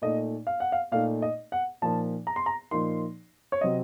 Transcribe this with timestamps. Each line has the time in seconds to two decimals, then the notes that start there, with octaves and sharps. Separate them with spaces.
0.02 A#2 A3 D#4 D#5
0.47 F5
0.60 F#5
0.72 F5
0.92 A#2 A3 D#4 F5
1.22 D#5
1.52 F#5
1.82 A#2 F3 A#3 D#4 A5
2.27 A#5
2.36 C6
2.46 A#5
2.71 A#2 F3 A#3 D#4 C6
3.52 C#5
3.61 C3 F#3 C4 D#5